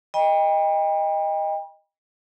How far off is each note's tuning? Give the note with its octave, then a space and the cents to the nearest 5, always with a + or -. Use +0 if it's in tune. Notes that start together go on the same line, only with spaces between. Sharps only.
D#5 +0 G5 +30 B5 -40